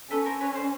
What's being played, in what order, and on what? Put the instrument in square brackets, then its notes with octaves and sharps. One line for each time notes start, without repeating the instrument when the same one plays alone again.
[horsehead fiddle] C#4 [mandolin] A4 B4
[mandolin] A#4 C5
B4 C#5
C5 D5